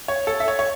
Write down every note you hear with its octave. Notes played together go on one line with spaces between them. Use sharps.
C#5
A4
E5
C#5
C#5